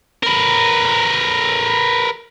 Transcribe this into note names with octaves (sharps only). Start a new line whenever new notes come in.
A#4 B4